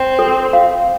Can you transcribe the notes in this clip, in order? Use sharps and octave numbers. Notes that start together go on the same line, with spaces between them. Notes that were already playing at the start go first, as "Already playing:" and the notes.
Already playing: C4
A4
F5